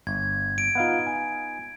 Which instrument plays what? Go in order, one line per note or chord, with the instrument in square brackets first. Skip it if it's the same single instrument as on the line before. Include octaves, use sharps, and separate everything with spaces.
[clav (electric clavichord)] G1 [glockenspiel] G#6
[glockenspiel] D7
[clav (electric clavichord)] B3 D#4 [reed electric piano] F4 F5 F#5
[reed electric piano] G#5